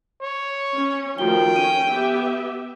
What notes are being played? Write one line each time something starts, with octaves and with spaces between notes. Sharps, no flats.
C#5
C#4
D#3 F3 A3 F4 F#4 G5 G7
C#4 D#7
B3 G4 E5